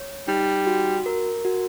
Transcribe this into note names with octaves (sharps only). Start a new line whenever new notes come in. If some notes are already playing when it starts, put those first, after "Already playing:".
Already playing: C#5
G3 D#4
F#4
A#4
F#4